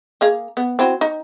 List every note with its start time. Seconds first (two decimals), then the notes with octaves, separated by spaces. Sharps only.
0.21 A#3 G#4 F5
0.57 B3
0.79 C4 E4 F#4
1.01 D#4